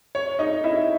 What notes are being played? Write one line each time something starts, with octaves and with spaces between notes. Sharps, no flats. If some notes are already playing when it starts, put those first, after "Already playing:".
C#5
D#4 D#5
E4 E5